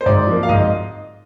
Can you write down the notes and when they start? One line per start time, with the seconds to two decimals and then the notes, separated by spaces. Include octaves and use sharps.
0.01 C5
0.06 G#2 D5
0.27 F3 A#3
0.43 F5
0.49 G#2 D#5
0.60 D#5